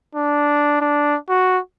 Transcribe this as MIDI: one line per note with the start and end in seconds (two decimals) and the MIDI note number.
0.15 0.77 62
0.81 1.16 62
1.29 1.59 66